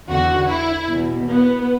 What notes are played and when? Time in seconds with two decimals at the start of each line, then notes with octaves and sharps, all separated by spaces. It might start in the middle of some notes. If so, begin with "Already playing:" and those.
0.10 E2 D3 F#4
0.50 E4
0.90 E2 B2
1.30 B3